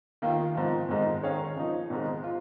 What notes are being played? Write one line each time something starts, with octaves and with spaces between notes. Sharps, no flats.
D#2 D#3 A#3 F4
G#1 G#2 F3
G#1 G#2 G#3 D#4
D#3 C#4 G#4 C#5 F5
C#3 F3 A#3 D#4
G#1 G#2 G#3
F4